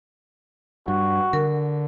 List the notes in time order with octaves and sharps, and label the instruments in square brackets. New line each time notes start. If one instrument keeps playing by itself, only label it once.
[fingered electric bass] G2 [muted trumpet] F#4
[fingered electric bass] D3 [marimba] A#4